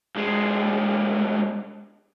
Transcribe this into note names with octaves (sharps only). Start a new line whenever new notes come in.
B1 G#3